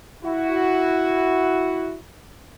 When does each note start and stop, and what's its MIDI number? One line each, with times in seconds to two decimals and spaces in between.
0.23 1.97 64
0.23 1.97 66